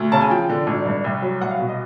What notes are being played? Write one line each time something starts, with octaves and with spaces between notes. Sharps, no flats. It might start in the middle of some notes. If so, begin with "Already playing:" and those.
Already playing: D2
C#3 A5
G#5
F3 G5
D3
G#1
G2
C2
F#3
C2 F#5
F5
B2
D#5